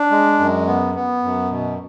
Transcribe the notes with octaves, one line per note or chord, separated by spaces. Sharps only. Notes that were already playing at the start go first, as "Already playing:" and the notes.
Already playing: D4
G#3
F#2
B3
B3
F#2
B2